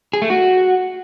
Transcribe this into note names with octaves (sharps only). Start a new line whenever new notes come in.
G#4
A3
F#4